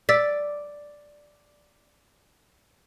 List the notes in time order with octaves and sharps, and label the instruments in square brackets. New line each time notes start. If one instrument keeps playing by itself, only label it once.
[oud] D5 [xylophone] E6 A6 B6